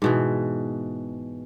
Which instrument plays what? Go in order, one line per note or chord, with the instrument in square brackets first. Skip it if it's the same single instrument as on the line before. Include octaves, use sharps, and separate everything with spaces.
[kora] G#2 B2 E3